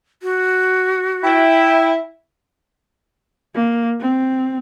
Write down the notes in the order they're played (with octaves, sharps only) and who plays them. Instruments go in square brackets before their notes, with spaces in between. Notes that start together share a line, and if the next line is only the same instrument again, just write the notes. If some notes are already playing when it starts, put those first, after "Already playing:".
[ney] F#4
[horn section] E4 [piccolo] G5
[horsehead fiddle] A#3
C4